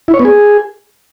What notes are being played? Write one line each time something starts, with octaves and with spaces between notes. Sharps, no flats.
E4
C#5
B3
G#4